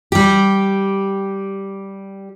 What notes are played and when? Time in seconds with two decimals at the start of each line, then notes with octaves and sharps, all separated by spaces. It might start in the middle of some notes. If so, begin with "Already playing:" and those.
0.12 G3 G4